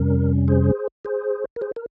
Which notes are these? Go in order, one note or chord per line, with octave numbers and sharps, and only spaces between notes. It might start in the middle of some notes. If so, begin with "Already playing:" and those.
Already playing: F2 C3 G3 C#4 A#4
G#4 C5
G#4 C5
A#4
G#4 C5
A#4